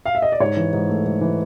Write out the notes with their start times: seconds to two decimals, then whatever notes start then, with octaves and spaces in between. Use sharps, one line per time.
0.06 F5
0.15 E5
0.22 D#5
0.32 D5
0.40 G#2 C#5
0.57 E3
0.73 G#2
0.89 A3
1.06 G#2
1.21 E3